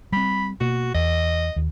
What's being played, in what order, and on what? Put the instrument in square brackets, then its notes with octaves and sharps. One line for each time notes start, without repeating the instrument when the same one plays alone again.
[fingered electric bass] G3 C4 [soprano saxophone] B5
[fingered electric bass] B2 A#3 [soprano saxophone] F#4
[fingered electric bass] E2 [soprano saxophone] D#5
[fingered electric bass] D#2